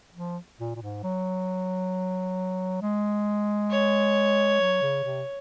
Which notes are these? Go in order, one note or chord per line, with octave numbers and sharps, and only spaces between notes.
F3
A#2
A#2
G#2
F#3
G#3
C#5
F#3
C#3
C3